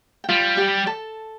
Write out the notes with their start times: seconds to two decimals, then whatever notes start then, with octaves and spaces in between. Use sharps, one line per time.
0.24 G5
0.29 G3 F4 F5
0.57 G4 G5
0.87 A4 A5